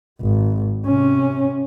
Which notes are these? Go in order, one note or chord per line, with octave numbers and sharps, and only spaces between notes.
G#1
C3 C#4